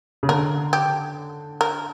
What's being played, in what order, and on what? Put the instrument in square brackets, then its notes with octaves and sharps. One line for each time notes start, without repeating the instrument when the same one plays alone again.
[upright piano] C#3
[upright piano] D3 [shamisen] A#4
[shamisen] G4
A#4